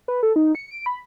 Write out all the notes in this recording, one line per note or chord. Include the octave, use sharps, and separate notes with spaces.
B4
A4
D#4
C#7
D7
B5